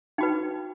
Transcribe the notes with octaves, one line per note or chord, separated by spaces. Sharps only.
D#4 F#4 B4 G5